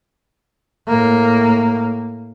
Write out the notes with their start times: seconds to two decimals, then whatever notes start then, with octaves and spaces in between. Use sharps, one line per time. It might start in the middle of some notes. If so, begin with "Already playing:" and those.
0.87 A2 A#3